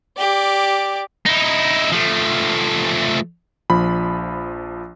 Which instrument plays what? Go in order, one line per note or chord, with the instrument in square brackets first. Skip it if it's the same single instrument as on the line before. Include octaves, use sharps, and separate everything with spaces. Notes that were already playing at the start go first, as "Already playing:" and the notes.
[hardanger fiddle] G4 D5
[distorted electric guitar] D#4 E4
F3 A3
[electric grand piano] A#1 F3 B5